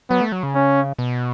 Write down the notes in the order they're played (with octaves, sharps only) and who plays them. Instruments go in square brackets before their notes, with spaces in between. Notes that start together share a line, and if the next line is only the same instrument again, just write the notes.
[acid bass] F#3 [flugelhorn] B3
[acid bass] A3
F#3
C#3
[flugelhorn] C#4
[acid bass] B2